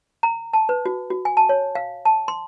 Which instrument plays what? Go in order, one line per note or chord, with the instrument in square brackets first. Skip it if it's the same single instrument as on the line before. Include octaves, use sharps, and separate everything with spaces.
[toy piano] A#5
A5
B4
F#4
F#4
G#5
A5
C#5
F5
A5
C6